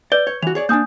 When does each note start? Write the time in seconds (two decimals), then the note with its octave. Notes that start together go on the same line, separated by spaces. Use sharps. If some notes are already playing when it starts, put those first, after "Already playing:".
0.12 B4 D5 G6 G7
0.27 C#5
0.43 E3 F#4 F7
0.55 G#4 C#5 D5
0.69 A#3 C#4 D4 G#5 D#6 G6